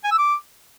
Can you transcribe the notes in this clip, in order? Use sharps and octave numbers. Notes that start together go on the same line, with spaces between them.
G#5
E6
D6